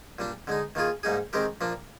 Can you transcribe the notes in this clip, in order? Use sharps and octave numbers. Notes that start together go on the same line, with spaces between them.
A#2 G3 D4
D3 G#3 D#4
D#3 A#3 F4 G#4
G#2 G3 A#3 D#4 G#4
D#3 G#3 C4 G4 A#4
A#2 F3 A#3 D4